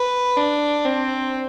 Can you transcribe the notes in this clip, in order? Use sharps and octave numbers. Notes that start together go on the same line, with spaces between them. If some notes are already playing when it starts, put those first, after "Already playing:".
Already playing: B4
D4
C4